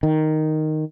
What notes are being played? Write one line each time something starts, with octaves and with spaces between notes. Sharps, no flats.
D#3